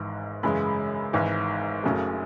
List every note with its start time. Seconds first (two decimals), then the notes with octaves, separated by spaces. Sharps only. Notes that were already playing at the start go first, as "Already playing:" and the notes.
Already playing: G#1 G#2 E3
0.43 F#2 C#3 E3 G#3 B5
1.13 G#1 G#2 E3
1.84 F#1 F#2 C#3 F#3 A3